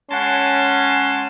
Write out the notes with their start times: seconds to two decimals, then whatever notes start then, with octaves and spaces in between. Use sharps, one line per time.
0.10 G#3 C#4 F#5 A5 C6